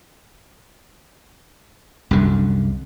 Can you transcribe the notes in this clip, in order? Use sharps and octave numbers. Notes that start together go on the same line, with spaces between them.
C2 F#2 D3